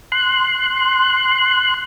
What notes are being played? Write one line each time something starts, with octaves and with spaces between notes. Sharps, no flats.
C6 F#6